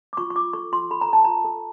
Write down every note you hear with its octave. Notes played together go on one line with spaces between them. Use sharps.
D6
F4 C#6
C#6
F4 D6
A4 C#6
F4 C6
A4 B5
A#5
A4 A5
F4 A#5
A4